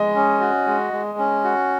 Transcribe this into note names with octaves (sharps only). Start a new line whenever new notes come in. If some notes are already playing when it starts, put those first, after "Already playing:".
Already playing: G#3 D#5
C#4
F#4
G#3
G#3
C#4
F#4